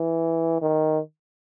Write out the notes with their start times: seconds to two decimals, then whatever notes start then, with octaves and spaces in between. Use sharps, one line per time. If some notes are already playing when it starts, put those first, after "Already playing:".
Already playing: E3
0.62 D#3